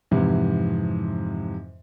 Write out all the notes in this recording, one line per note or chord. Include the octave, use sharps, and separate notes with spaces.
F2 G#2 C3 E3